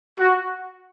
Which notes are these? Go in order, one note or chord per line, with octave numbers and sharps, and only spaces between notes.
F#4